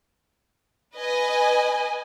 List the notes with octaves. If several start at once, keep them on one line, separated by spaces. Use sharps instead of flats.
B4 D#5 G#5